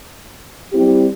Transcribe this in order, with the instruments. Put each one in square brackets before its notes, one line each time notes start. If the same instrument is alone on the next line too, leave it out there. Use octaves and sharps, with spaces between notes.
[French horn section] G3 C4 E4 G4